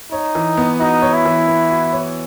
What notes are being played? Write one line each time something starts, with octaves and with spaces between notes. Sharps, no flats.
D#4 C#5
E3
B3
D#4 F#4
C#5
E4
E3
B3
F#4
C#5